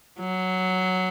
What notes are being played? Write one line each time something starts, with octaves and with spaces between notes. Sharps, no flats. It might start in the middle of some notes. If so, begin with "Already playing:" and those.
F#3